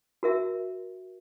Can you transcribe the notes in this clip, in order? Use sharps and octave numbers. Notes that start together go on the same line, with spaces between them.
F#4 A#4 E5